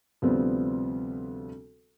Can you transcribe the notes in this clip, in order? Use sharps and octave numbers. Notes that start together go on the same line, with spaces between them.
D2 C3 F3 G3 B3 C4